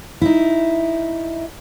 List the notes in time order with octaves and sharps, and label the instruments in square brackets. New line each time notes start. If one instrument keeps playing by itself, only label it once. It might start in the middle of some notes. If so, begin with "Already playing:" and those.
[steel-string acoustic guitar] D#4 E4